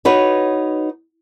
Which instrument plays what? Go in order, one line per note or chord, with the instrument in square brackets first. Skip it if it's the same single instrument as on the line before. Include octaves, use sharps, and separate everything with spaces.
[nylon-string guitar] D#4 F#4 B4 C#5